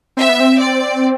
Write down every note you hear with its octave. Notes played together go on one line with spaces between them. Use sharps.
C4 E5
B3
C4
D5